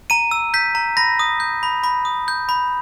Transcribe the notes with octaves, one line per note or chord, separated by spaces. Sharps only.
A#5 D#7
E6
G6 B6
A#5
B5 A#6
D#6
G6
B5
B5
D#6
G6
B5